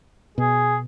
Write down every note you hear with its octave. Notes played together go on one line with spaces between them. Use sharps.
B2 G#4